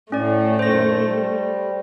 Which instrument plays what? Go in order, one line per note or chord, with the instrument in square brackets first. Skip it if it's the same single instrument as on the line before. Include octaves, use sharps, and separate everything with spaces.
[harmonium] A2 [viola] A3 [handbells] C#4 D5
[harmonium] F#2 A#2 D#3 [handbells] C5 A#6
[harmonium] G3